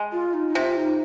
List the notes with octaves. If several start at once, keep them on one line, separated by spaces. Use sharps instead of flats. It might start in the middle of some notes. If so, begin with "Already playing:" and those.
Already playing: G#3
F4
D#4
D#4
C3 F4
D#4